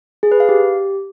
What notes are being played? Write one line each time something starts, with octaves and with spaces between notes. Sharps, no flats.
G#4
B4
F5
G4